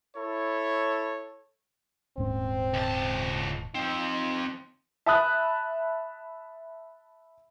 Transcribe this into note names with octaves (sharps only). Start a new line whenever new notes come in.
E4 A4 C#5
D#1 G#2 C4 C#4
C#2 A5
F3 C4 D#4
E5 A5 B5 D#6 F#6